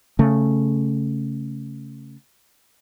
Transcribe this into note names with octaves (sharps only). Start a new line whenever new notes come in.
C#3 A3